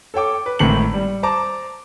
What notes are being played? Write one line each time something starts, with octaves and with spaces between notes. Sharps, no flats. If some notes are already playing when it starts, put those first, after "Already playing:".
A4 C#5 G5 D6
B4
G#1 A2 C4 C7 C#7 F#7
G3
C5 A5 A#5 D6